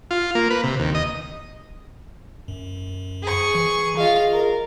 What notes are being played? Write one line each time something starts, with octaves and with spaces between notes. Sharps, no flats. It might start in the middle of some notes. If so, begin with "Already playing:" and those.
F4
A#3
B4
C3
D#2
D#5
F#2
G#4 C#6
E3
F4 G#4 D#5 F5
A#4